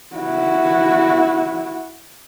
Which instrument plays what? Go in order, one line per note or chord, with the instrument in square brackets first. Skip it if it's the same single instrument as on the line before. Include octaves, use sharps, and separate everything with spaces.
[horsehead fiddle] E4 F#4